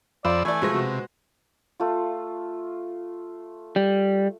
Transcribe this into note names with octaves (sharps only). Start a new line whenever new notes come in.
F2 F4 C5 D5 B5 E6
E3 A3 D5 G#5
B2 F3 G#3 B4 C5 A#6
C3 F#4
A3 F4
G3